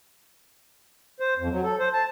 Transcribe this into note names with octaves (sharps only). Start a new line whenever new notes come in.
C5
F2
F#3
A4
C5
A5